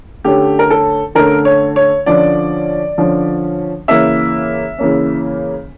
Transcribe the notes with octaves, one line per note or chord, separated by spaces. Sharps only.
D3 A3 C#4 G4
A#4
A4
D3 A3 C#4 A#4
C#5
C#5
D3 F3 C#4 D5
D3 F3 C#4
C#3 E3 A#3 C#4 E5
C#3 E3 A#3 C#4